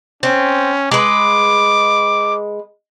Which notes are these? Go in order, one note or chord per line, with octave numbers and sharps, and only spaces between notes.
C4 C#4
G#3 B4 D6